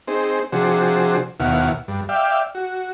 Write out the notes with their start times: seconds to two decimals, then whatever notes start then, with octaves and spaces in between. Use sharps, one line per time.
0.08 C4 D#4 G#4 C5
0.52 C3 F3 D4 F#4 G#4 C5
1.40 D#2 B2 E4 F5 F#5
1.88 G2
2.09 D5 E5 F5 G5
2.55 F#4